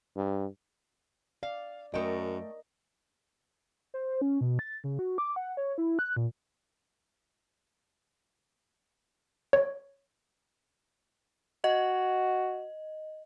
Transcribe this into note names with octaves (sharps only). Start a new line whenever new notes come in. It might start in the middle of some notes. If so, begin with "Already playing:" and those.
G2
D5 F5
F#2 A3 A#4 D5 D#5 G5
C5
C#4
B2
A6
C#3
F#4
D6
F#5
C#5
E4
F#6
A#2
C#5
F#4 D#5